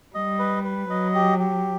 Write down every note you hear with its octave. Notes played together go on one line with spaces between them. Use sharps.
G3 D#5
B4
B4
F#3 D#5
G4
G4